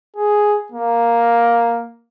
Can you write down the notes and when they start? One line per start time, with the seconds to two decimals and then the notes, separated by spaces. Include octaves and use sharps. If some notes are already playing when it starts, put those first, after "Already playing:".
0.16 G#4
0.72 A#3